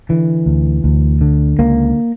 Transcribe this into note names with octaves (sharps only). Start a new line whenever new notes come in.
D3 E3
D2
D2
D3
C#2 A#3